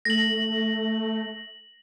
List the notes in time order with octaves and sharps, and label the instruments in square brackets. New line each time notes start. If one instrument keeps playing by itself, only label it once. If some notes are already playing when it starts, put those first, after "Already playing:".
[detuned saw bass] A3 [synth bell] A#6 F#7